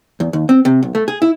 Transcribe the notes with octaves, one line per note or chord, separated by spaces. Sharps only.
E2
D#2
C4
C3
B1
A3
G#4
E4